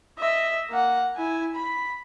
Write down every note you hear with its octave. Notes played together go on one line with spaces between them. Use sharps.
D#5 E5
A#3 F#5
E4 G#5
B5